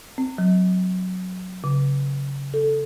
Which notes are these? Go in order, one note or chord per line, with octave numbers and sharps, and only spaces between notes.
C4
F#3
C#3
A4